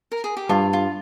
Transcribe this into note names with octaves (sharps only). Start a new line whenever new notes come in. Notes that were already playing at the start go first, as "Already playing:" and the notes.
A#4
G#4
G4
G2 F4
F4